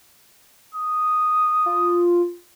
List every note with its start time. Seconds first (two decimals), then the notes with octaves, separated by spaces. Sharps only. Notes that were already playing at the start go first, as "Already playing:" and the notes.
0.75 D#6
1.66 F4